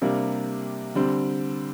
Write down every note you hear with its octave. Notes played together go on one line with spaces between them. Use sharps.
C3 G3 A#3 D4
D3 G3 C4